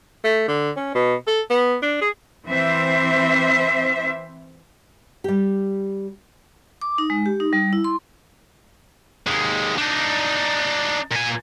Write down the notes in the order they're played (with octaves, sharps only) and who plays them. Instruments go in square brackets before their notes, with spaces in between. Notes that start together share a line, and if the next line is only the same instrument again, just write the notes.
[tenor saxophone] A3
D3
C#4
B2
A4
B3
D4
G#4
[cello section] E3 C4 C5 E5
[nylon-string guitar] G3 G4
[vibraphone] D6
D#4
G#3
G4
D#4
G3
E4
C6
[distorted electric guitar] D#2 G#3
D4 D#4
A#2 G#5